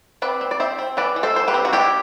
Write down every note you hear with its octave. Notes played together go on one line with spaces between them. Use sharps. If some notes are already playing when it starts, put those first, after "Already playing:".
C4 B4 D5
C4
D5
C4 C5 E5
C4
E3 B4 D5
E3
A4 C5
E3 C5
G4 B4
C4
F#4
D4 E4 G4